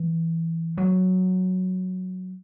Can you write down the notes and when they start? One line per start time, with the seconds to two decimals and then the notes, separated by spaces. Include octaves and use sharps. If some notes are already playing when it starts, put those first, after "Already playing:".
Already playing: E3
0.78 F#3